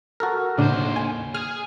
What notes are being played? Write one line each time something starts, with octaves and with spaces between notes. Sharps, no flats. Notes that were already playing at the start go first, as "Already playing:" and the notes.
F#4 A4 A#4
D#2 A2 C#3 D4 C5
G#5
G#4 G#5 F6